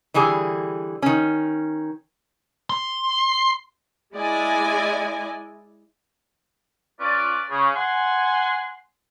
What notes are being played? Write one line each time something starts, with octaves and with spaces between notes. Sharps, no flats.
D3 E3 G3 G#4
D#3 C#4
C6
G#3 E4 D5 D#5 G#5
C#4 F4 B4 D5
C#3 G#4
F#5 G#5 C6